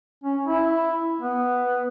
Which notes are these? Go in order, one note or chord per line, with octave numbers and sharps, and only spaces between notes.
C#4
E4
B3